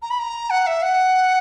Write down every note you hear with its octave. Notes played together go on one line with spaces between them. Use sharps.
A#5
B5
A#5
F#5
E5
F#5